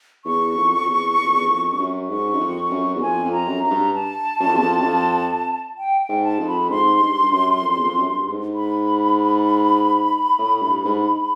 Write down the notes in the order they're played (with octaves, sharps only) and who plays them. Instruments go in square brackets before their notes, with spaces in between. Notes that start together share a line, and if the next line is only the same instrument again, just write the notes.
[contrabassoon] E2 [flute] C#6
[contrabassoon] F2
F2
E2
E2
F2
E2
F2
G2
F#2
[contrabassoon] G#2 [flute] C#6
[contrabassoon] F#2
F2
F#2
E2
[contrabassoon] F2 [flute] G#5
[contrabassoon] F2
[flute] A#5
[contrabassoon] F#2
[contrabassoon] F#2 [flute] A#5
[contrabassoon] G2
[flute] A5
[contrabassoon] F#2
F2
E2
F2
F#2
F2
[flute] G5
G5
[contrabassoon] G#2
[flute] A5
[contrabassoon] F2
[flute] B5
[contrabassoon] G#2 [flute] C6
[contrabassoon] G2
G2
F#2
F2
E2
F2
F#2
G2
G2
G#2
[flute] B5
[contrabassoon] A2
G2
G#2